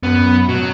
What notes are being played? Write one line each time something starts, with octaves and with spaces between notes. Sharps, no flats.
F#2 B3
B2 F#3